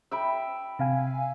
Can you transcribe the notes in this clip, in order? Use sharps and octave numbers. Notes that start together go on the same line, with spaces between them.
E5 G5 B5
C3 F5 G#5